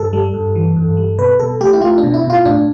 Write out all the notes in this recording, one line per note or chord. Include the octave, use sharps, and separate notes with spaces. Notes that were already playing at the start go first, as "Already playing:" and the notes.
Already playing: G2 A4
G3
G2
E3
G2
G3
B2 B4
B2 A4
A3 G4
E4
A3 F4
D4
B2
E4
B2
F4
A2 D4